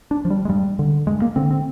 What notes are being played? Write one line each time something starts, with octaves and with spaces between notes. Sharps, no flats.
D4
F3
G3
G#3
G2 G3
D3
G2 G#3
A#3
D3 C4
C4